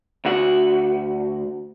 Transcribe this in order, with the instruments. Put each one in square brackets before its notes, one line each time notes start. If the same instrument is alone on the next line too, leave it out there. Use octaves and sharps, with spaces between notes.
[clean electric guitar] D2 F#4